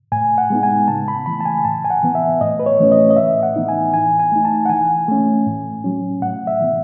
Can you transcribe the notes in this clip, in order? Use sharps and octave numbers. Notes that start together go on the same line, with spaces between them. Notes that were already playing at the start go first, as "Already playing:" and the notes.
A2 G#5
F#5
G#3 B3 D#4
G#5
C#3 A5
B5
E3 A3 B5
A5
G#5
A2 A5
G#5
F#5
E3 B3
E5
A2 D#5
B4
C#5
E3 A3 C#4
D#5
D#5
A2 E5
F#5
E3 B3 D#4
G#5
E3 G#5
G#5
A3 D#4
A5
F#5
E3 G#5
A3 C#4
A2
F#3 C#4
A2 F#5
E5
E3 B3